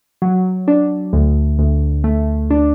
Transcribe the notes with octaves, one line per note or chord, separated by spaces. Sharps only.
F#3
D4
D2
D2
A3
D4